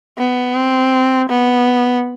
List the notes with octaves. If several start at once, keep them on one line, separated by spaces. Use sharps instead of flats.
B3
C4
B3